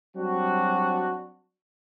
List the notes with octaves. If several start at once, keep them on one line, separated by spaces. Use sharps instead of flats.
F#3 G3 C4 D4 F#4